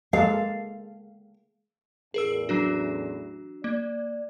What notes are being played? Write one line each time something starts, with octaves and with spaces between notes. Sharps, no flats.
G#3 A#3 A4 F5
A1 E2 G#4 A#4 E6
F#3 D4 F#4
A#3 D5